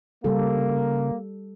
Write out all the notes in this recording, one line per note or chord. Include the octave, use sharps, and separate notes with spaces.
C#3 G3 A#3 A4